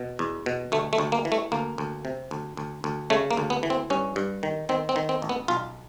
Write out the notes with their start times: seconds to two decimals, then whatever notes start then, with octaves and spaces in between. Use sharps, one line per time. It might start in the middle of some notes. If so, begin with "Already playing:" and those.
Already playing: B2
0.19 E2
0.46 B2
0.72 D2 A3
0.93 A3
0.98 D2
1.12 A#3
1.25 E3
1.32 A3
1.52 D2 A#3
1.78 D2
2.05 C3
2.31 D2
2.57 D2
2.84 D2
3.10 C#3 A3
3.31 A#3
3.37 D2
3.50 B3
3.63 E3
3.70 C4
3.90 G2 C#4
4.16 G2
4.43 D#3
4.69 D#3 C4
4.89 C4
4.96 D#3
5.09 C4
5.22 A1
5.29 B3
5.48 B1 F4